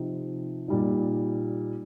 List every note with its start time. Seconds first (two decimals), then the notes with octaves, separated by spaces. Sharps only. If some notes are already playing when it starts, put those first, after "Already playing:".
Already playing: C3 F3 C4 D#4
0.68 A#2 G3 D#4